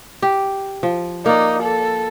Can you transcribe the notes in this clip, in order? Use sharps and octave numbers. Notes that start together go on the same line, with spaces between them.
G4
F3
A#3 D#4 D5
A4